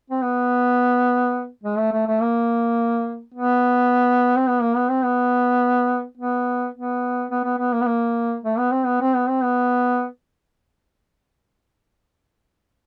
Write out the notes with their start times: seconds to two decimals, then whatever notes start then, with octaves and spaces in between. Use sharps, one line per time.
0.10 C4
0.22 B3
1.64 G#3
1.78 A3
1.93 A3
2.07 A3
2.21 A#3
3.34 B3
4.37 C4
4.48 B3
4.62 A#3
4.76 B3
4.89 C4
5.03 B3
6.17 B3
6.74 B3
7.31 B3
7.44 B3
7.58 B3
7.73 A#3
7.82 B3
7.87 A#3
8.44 A3
8.58 B3
8.72 C4
8.86 B3
9.01 C4
9.15 B3
9.29 C4
9.43 B3